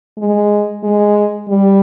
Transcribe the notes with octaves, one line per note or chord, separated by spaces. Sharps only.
G#3
G#3
G3